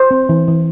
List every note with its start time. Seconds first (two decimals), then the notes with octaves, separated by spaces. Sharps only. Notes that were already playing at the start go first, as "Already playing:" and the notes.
Already playing: C5
0.11 C4
0.29 E3
0.48 E3